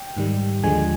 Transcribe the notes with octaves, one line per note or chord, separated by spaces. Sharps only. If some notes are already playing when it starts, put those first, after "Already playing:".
Already playing: G5
G#2 D#3 G3
D#2 D3 F3 G#3 G#5